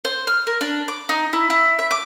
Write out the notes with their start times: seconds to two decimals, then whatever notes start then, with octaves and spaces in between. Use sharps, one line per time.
0.05 C5
0.27 F6
0.47 A#4
0.61 D4
0.88 D6
1.09 D#4
1.33 E4
1.50 E4
1.79 E5
1.91 D6